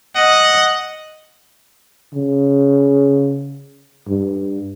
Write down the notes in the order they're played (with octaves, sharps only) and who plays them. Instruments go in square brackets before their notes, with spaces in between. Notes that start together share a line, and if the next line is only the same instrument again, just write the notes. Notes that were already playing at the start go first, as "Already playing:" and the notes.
[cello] D#5 [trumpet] F#5
[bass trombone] C#3
G2